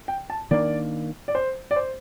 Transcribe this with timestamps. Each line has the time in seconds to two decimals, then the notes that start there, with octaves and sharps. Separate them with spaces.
0.08 G5
0.30 A5
0.51 D#3 A#3 D4 D5
1.28 D5
1.35 C5
1.71 D5
1.76 C5